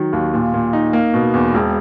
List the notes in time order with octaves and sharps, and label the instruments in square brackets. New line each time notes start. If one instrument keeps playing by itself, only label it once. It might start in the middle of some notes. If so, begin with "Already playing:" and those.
Already playing: [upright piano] D#3 F#3
D#2
A#2
A#2
D#4
A#3
B2
E2
E1